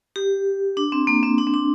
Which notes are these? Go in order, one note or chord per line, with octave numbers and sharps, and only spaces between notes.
G4
D4
C4
A#3
C4
D4
C4
D4